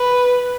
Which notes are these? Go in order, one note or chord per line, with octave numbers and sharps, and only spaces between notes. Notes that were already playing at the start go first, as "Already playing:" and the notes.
Already playing: B4